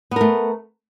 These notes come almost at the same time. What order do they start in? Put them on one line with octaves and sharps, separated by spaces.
B3 A#4 A3